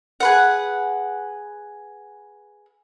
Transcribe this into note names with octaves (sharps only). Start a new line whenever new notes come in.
G#4 B4 F#5